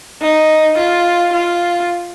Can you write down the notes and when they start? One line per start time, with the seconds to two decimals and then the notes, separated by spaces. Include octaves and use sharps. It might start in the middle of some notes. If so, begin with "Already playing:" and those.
0.22 D#4
0.78 F4
1.33 F4